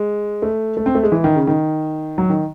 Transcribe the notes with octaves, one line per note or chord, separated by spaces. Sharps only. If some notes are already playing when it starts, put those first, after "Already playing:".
Already playing: G#3
A3
A3
C4
A3
G#3
E3
D#3
C#3
D#3
F#3
D#3